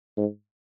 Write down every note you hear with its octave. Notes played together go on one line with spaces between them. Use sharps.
G#2